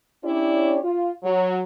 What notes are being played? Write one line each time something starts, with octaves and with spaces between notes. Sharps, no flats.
C#4 D4 E4 G4 C#5 D5
F4
F#3 C#5